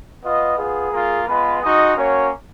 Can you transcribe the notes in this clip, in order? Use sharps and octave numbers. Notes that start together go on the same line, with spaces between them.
B3 F4 D#5
B3 F4 G#4
A#3 F4
G#3 B3 F4 B4
G#3 D#4 F#4 D#5
A#3 C#4 F#4 C#5